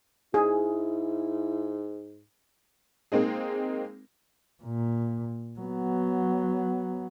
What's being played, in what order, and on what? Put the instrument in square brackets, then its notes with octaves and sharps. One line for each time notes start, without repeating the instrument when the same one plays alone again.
[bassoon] G#2 [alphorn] E4 [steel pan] G#4
[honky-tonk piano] G#3 A#3 C4 D#4 G#4
[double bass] A#2
F#3 B3